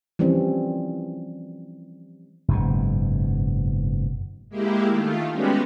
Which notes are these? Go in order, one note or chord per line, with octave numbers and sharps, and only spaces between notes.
E3 F3 G3 C4 C#4
F#1 G#2 B2
G#3 A#3 E4 G4
D#3 A3 F4
G3 G#3 B3 C#4 F#4 G4